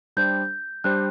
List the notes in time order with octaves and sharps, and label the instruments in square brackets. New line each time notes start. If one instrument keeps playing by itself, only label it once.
[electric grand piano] G3 D4 G4 C5 [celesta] G6
[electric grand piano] G3 D4 G4 C5 [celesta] F#6